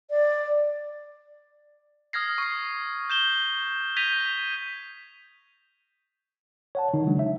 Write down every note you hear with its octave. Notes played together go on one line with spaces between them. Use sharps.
D5
D#6 F6 G#6 A#6 C7
C#6 C7
G6 E7 G7
G6 G#6 A#6 B6 D#7 F7
C#5 F#5 A5
D3 D#3 D#4
C#3 F#3 G#3 D4
E5